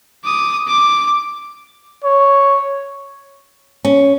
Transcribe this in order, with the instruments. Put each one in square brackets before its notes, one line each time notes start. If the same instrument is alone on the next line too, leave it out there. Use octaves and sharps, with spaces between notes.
[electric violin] D6 D#6
D6
[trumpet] C#5
[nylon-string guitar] C#4